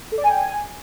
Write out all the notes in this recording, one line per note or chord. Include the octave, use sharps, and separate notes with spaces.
A4
D5
G#5
G5
G#5